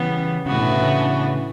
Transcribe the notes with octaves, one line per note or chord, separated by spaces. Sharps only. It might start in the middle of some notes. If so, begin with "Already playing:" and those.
Already playing: C#3 E3 G3 B3
A2 C#3 E3 B3 D4 F#4
B2
C#3
C#3